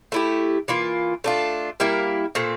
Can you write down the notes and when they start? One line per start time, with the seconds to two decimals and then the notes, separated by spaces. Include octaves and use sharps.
0.12 A3 E4 G4
0.68 E3 A#3 F4
1.24 A3 D4 F4
1.80 G3 A#3 E4 A#4
2.35 A#2 A3 C4